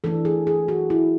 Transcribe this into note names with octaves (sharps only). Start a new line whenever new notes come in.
E3 A3 D4 A4
G#4
G#4
F#4
E4